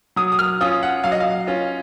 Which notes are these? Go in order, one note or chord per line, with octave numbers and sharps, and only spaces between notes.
F#3 D#6
D#6
F6
C#4 F4 D#6
F#5
F#3 F5
D#5
F5
C#4 F4